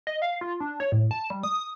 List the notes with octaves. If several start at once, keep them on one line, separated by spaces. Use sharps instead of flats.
D#5
F5
F4
D4
C#5
A2
A5
G3
D#6